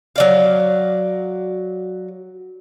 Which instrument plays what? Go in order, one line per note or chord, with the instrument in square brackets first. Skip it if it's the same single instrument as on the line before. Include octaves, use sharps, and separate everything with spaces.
[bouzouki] F#3 D5 F5